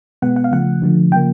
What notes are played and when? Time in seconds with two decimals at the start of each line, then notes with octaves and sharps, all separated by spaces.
0.22 B2 G#3 B3 F#5
0.36 F#5
0.44 F5
0.51 C#3 F3 A3 F#5
0.82 D3 F3 A3
1.12 C#3 F3 A#3 G5